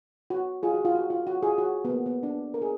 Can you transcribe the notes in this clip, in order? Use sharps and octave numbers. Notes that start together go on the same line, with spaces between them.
F#4
F4 G#4
F#4
F4
F#4
F4
F#4
F4 G#4
F#4
B3
A#3
B3
D4
A#4
G#4